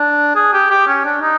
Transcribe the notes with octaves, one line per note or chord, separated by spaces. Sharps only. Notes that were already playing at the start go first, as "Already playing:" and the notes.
Already playing: D4
G#4
G4
G4
C#4
D4
D#4